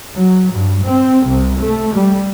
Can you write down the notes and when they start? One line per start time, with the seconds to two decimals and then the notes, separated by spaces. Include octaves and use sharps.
0.14 F#3
0.53 G2
0.84 C4
1.27 C2
1.61 A3
1.96 G3